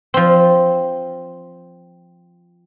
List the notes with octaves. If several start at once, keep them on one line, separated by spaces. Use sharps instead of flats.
F3 C4